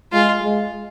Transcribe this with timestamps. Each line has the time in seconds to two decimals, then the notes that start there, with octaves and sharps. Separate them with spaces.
0.12 G#3 F4
0.43 G#3